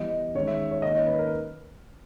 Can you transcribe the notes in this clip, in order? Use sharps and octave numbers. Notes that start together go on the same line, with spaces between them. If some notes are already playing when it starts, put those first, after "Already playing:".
Already playing: E3 G3 B3 D#5
D#3 G#3 C#4 C#5
E5
C#5
D#3 A#3 C#4 D#5
C#5
B4
A#4